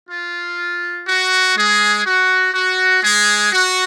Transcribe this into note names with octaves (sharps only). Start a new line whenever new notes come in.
F4
F#4
G#3 G#4
F#4
F#4
G#3 G#4
F#4